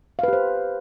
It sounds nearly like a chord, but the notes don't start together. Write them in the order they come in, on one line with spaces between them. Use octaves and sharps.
F5 B4 G4 C5